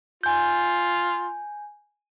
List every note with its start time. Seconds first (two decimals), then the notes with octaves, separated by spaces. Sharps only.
0.23 F4 G#5 G6